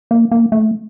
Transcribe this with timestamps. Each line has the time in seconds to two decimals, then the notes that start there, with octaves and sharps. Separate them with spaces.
0.11 A#3
0.31 A#3
0.52 A3